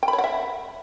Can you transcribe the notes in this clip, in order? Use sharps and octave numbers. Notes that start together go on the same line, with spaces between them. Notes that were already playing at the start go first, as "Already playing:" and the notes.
G5
B5
C#5
F#5
E5